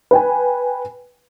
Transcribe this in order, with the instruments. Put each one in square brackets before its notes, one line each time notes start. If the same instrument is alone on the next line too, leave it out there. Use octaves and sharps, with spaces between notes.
[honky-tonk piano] B4 G5 G#5